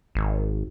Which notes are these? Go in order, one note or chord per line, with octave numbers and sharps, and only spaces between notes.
G#1